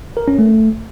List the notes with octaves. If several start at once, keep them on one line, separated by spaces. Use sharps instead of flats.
A#4
C#4
A3